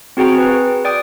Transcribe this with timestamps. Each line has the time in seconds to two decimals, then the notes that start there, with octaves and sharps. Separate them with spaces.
0.17 C4 F#4 G#4 G5 A#5
0.38 B4
0.85 D5 G5 D#6